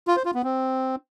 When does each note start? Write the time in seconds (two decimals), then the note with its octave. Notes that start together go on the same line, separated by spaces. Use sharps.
0.08 F4
0.16 C5
0.25 F4
0.34 B3
0.43 C4